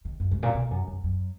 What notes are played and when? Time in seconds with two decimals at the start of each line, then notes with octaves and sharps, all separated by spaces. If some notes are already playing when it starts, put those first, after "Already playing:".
0.05 D#3
0.20 F#2
0.31 G#2
0.43 A#2
0.54 B2
0.71 F#2
0.88 F#2
1.04 F#2